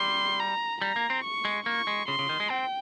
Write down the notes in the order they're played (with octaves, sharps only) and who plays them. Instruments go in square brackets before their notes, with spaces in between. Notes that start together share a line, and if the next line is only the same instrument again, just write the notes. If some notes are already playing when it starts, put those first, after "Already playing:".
Already playing: [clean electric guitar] G3 [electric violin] C6
[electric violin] A#5
[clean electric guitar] G3 [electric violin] A#5
[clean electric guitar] A#3
C4
[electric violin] C#6
[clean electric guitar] G#3
[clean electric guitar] A#3 [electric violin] C#6
[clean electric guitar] G#3
[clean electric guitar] C#3 [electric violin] C6
[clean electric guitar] C#3
D#3
G#3
[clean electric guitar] C4 [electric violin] G5